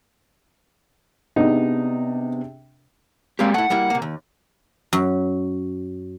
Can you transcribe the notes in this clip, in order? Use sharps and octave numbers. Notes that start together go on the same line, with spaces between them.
C3 B3 D4 D#4 G#4
G#3 A#3 C4 G4 F5
A3 E4 F#5
G3 A#3 E4
C3 A#3
D#2
F#2